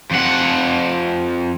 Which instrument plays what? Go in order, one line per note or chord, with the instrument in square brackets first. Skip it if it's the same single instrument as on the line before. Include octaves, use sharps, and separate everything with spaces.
[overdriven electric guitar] F2 F#5